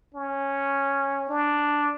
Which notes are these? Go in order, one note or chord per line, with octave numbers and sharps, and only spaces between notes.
C#4
D4